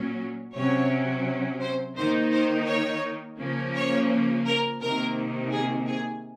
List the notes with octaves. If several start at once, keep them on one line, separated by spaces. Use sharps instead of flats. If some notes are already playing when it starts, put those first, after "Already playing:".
Already playing: A#2 F#3 C#4
C3 F#3 C#4 C#5
C5
D#3 A#3 D#4 C5
C5
C#5
C#3 F3 A#3 C#4
C#5
A#4
C3 D#3 A#3 A#4
G#4
G#4